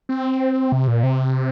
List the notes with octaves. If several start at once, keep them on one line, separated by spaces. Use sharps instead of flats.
C4
C3
A#2
C3